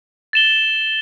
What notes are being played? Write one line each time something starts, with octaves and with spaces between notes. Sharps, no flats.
A6 E7 G7